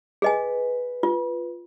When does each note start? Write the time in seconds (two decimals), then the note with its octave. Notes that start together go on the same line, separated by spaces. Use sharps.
0.22 G#4 B4 D#5 G#5
1.03 F4